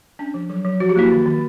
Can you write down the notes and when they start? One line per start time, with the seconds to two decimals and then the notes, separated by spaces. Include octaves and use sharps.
0.19 C#4 D4
0.34 F3
0.50 F#3
0.64 F#3
0.80 F3 F#4
0.89 G4
0.96 A#3 E4 F#4
1.11 D#3
1.26 D#3